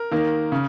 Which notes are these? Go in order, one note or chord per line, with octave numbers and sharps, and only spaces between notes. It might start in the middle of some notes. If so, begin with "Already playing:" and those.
Already playing: A#4
D#3 A#3
C#3